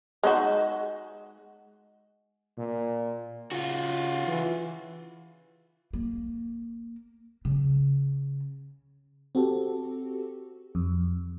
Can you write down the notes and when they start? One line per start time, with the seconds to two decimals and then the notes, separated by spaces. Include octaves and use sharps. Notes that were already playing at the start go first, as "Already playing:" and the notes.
0.24 G#3 D#4 F#4
2.58 A#2
3.52 C#3 F4 F#4
4.27 E3
5.93 A#3
7.45 C#3
9.35 C4 F#4 G4 A4
10.75 F2